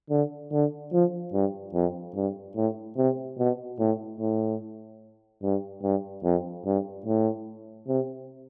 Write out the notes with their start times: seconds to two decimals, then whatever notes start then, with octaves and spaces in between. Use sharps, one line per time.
0.10 D3
0.52 D3
0.93 F3
1.33 G2
1.74 F2
2.15 G2
2.56 A2
2.97 C3
3.39 B2
3.79 A2
4.20 A2
5.43 G2
5.83 G2
6.24 F2
6.66 G2
7.06 A2
7.88 C3